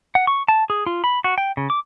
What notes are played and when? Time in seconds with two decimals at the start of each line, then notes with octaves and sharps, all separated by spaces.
0.15 F#5
0.27 C#6
0.48 A5
0.70 G#4
0.86 F4
1.04 B5
1.24 F#4
1.38 G5
1.57 C#3
1.70 D6